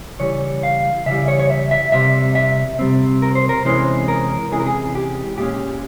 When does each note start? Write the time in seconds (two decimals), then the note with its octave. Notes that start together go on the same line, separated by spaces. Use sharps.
0.20 C#3 E3 G3 C#5
0.63 F5
1.06 C#3 E3 G3 E5
1.28 C#5
1.39 C#5
1.50 E5
1.71 E5
1.92 C3 G3 C4 E5
2.35 E5
2.79 C3 G3 C4
3.22 A#4
3.35 C5
3.49 A#4
3.65 E2 C3 E3 G#3 C#4 C5
4.08 A#4
4.51 E2 C3 E3 G#3 C#4 G#4
4.60 A#4
4.66 G#4
4.95 G4
5.38 A#2 G#3 C#4 G4